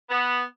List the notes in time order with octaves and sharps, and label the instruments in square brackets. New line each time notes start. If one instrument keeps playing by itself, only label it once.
[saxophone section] B3